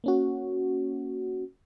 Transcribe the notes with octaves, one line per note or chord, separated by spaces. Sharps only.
A#3 C#4 F#4